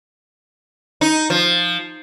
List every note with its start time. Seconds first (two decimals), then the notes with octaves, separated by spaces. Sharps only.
1.01 D#4
1.30 F3